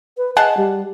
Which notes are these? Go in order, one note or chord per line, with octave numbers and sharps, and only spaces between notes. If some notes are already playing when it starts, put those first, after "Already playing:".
B4
G#4 D#5 F#5 A5
G3